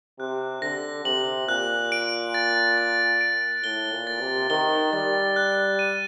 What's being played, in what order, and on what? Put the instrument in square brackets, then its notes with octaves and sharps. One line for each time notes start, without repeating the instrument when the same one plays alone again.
[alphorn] C3 [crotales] F#6
[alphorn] D3 [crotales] A#6
[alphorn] C3 [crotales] F#7
[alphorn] A#2 [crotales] F#6
[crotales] D7
A6
A6
D7
[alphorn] A2 [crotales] G7
[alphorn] A#2
[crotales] A6
[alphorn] C3
[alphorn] D#3 [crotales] G7
[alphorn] G3 [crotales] A6
[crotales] F#6
D#7